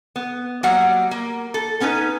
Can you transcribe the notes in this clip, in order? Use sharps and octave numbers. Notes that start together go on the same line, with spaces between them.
B3
F#3 G3 A#3 F#4 D5 F#5
A#3
A4
B3 C#4 D#4 B4